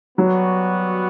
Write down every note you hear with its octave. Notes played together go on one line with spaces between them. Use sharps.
F#3 G3 B3 F#4